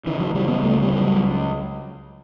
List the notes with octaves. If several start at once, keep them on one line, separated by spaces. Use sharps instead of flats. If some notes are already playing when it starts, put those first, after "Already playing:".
C#3 E3
F#3
C#3 G3
B3
C#2 A3
G3
C#2
F#3